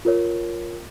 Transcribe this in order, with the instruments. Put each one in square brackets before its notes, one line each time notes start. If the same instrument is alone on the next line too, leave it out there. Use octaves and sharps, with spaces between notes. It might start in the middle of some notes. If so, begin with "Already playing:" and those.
[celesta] F4 A#4 C#5